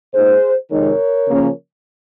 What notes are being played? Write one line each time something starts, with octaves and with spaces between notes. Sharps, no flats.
A#2 G#3 D#4 G#4 C5
F2 C3 D#3 G#3 D#4 A#4 C#5
C#3 F3 A#3 C#4